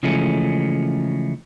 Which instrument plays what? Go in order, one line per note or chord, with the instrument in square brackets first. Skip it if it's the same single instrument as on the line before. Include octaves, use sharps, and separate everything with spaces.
[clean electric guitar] C#3 E3 F3 G#3 A3 C#4